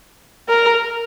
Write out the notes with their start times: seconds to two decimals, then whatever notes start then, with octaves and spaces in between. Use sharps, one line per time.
0.49 A#4